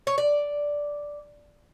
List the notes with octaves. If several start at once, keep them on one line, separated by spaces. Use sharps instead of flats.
C#5
D5